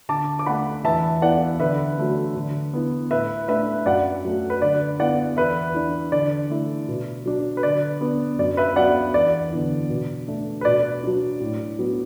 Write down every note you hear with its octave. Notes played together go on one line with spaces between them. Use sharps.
D3 A5 D6
D6
A3 D4 F#5 B5
E2 E5 A5
E3 B3 E4 D5 F#5
D3 B4 E5
F#3 A3 D4
D3
B3 E4
A2 B4 E5
A3 D4 B4 E5
F#2 D5 F#5
F#3 A3
B4
D3 D5
B3 E4 D5 F#5
E2 B4 E5
E3 D4
D3 D5
A3 E4
B2
F#3 D4
B4
D3 D5
B3 D4
F#2 D5
B4 E5
F#3 B3 D4 D5 F#5
E2 D5
D3 B3 E4
B2
A3 D4
B4
B2 D5
F#3 D4
A2
F#3 B3 D4